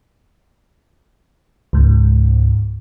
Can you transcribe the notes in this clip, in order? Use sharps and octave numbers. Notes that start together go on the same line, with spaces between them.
C#2 G#2